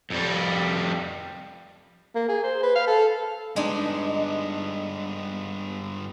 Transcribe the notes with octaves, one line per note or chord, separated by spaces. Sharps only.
F2 G3
A#3
G#4
C5
B4
F5
A4
G2 G#3 B3 D4 D#4